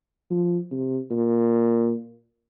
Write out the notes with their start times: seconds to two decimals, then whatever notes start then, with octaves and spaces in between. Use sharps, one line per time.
0.30 F3
0.71 C3
1.11 A#2